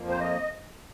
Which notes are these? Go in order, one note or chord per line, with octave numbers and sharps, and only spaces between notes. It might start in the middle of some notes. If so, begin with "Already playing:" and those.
Already playing: F2 F3 A#3
C5
D#5